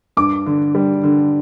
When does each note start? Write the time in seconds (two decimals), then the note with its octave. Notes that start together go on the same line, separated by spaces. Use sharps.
0.17 G2 D6
0.46 D3
0.75 G3
1.04 D3